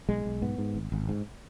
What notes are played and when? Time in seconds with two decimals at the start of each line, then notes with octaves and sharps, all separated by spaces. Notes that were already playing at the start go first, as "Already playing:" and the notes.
0.09 B1 G#3
0.25 B1
0.42 G#2 B3
0.58 G#2
0.75 G#1
0.92 G#1
1.09 G#2